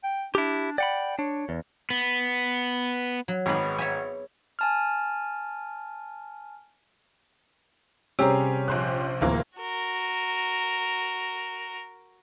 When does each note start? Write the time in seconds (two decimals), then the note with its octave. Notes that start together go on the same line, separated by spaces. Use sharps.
0.04 G5
0.35 D4 E4 G4
0.78 D5 F#5 G5 B5
1.19 D4 C#5
1.49 E2
1.90 B3
3.28 F#3
3.46 G#1 G#2 B3 G#4
3.78 C#5 E5 G#5
4.59 G#5 A5 F6
8.19 C3 G3 C4 C#4 G4 G#4 A#5
8.68 A#1 C5 F#6
9.21 D1 E3 A#3 C4 A#4
9.58 F#4 A#4